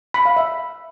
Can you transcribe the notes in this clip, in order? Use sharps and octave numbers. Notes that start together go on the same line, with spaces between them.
B5
F5
E5